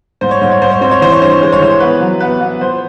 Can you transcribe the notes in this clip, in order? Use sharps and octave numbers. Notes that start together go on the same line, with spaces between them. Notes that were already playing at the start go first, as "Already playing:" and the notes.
G#2 C5
C#5
G#2 C5
C#5
G#2 C5
C#5
C4 C5
C#5
E3 C5
C#5
G2 C5
C#5
G#3 C5
C#5
E3 C5
B3 B4
F#3
B3 B4
B3
F3 C5